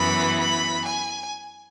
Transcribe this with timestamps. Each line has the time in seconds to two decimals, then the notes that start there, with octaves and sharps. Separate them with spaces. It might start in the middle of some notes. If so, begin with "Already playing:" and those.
Already playing: F#2 E3 B3 B5
0.39 B5
0.85 G#5